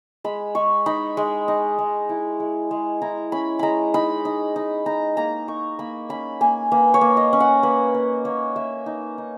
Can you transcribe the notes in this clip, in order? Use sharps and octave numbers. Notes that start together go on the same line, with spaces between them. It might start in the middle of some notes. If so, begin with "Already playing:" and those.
G#3 B5
G#3 C#6
D#4 B5
G#3
D#4
G#3
E4
G#3
G#3
E4 A#5
C#4 B5
G#3 A#5 B5
D#4 B5
D#4
D#4
D#4 A#5
A#3 A#5
D#4 C#6
A#3 B5
C#4 B5
A#3 G#5
A#3 B4
C#5
A#3
D#5
C#4
F#5
A#3 B4
A#3
A#3 C#5
A#3 E5
D#4
D#4